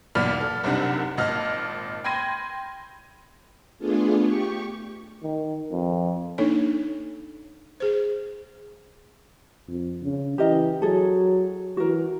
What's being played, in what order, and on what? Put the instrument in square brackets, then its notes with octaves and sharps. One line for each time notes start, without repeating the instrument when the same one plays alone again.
[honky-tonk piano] B1 E2 A#2 D5 B5 F6
A4
F#1 C2 C3 D4 D#4 F#5
G#1 A#2 D#5 A5 F6
G5 B5 C6 G#6 A#6 D#7
[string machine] A3 B3 D4 F4 G#4
G4 C#6
[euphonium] D#3
F2
[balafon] A#3 D4 D#4 A4 C#5
G#4 C5
[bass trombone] F2
C#3
[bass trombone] E3 [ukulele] G4 A#4 D#5
[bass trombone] F#3 [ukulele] G#4 A4
[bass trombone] E3 [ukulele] F#4 A#4